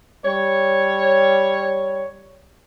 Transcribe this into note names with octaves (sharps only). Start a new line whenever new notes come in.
G3 C#5